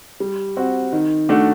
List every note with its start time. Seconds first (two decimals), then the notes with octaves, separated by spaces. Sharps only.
0.20 G3
0.57 C4 F#4
0.93 D#3
1.29 A3 D4 F#4